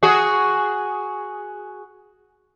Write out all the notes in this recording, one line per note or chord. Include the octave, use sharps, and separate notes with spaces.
F#4 G#4